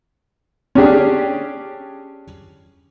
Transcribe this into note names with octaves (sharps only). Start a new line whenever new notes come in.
C#4 D4 G4 G#4